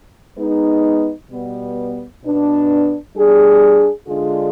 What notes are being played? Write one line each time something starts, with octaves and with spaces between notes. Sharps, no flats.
G#3 B3 D#4
B2 G3 B3
B2 B3 D4
G3 D4 G#4
D3 G#3 D4 F4 G#4